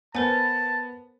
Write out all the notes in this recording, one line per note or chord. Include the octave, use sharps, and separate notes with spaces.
B3 A#4 C5 G#5 A5